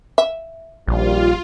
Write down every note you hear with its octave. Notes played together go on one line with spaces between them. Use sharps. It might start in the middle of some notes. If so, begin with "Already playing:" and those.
E5
A#1 D#2 G3 F4